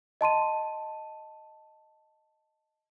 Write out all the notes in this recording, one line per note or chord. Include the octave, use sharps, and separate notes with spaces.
D#5 A5 C6 D#7